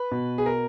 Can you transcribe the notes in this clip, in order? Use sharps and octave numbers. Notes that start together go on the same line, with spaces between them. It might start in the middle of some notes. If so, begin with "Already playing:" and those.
Already playing: B4
B2
G#4
A#4